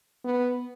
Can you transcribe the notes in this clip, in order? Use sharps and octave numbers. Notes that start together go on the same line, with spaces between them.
B3